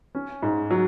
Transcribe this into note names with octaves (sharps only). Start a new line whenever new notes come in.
C#4
G#2
F#3